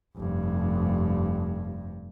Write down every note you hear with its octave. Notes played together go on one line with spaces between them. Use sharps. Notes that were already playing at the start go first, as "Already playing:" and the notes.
F1 G2